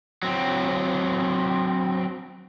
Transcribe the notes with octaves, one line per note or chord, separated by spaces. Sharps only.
F#3 C4